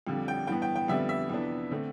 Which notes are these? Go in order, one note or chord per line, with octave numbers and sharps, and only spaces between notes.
F2 D3 G3
G5
G2 E3 B3 G5
G5
G5
F2 D3 G3 B3 E5
E5
F2 C3 E3 B3 D4
D3 A3 C4